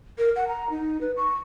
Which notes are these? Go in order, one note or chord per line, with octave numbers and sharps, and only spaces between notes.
A#4
F#5
A#5
D#4
B4
C#6